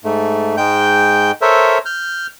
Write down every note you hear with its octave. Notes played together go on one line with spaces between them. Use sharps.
G#2 A3
G#2 G#3 G5 G6
A4 A#4 C5 C#5 E5
F6 G6